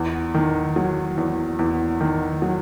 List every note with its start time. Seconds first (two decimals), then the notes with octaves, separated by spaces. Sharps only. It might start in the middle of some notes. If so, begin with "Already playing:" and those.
Already playing: E2
0.34 D#3
0.76 F#3
1.17 E2
1.59 E2
2.01 D#3
2.42 F#3